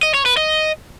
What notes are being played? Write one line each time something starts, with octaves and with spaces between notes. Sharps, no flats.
D#5
C#5
B4
D#5